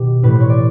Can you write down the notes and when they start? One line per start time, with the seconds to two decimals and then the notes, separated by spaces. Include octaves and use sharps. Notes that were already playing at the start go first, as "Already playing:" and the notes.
Already playing: B2 D#3 G4
0.23 A2 E3 B4
0.32 C5
0.41 C#5
0.49 D5